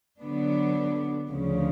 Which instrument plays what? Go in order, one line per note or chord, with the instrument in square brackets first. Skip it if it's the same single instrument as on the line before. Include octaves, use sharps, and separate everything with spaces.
[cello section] D3 F#3 B3 D4
D2 C#3 F3